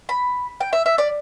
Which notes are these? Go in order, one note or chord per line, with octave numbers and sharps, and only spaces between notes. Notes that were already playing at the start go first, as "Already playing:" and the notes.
B5
G5
E5
E5
D5